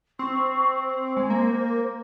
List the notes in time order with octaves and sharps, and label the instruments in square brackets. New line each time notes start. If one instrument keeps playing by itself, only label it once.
[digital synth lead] C4 [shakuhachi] C#6
[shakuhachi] C5
[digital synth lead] G#3
A#3